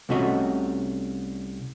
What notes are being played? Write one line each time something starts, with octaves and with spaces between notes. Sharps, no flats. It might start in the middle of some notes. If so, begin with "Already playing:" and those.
C2 C3 A3 C#4 F#4 D#5